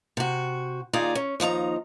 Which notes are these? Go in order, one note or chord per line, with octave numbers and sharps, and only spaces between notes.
C3 F#4
D#2 D#4 F4 G#4 D5 A#5
C#4
D#2 F3 D#4 A#5